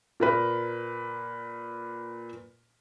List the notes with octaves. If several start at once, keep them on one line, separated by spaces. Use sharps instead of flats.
A#2 A#4 B4